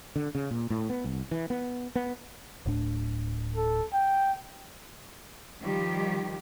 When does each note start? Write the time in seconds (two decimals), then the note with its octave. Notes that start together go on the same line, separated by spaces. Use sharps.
0.16 D3
0.35 C#3
0.51 A#2
0.70 A2
0.90 B3
1.04 C2
1.31 E3
1.50 B3
1.96 B3
2.65 D1 A2 D4
3.56 A4
3.93 G5
5.61 D#3 F3 G3 G4